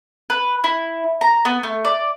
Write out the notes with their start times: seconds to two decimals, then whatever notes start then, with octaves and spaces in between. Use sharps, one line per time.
0.30 B4
0.64 E4
1.21 A#5
1.45 B3
1.63 A3
1.85 D5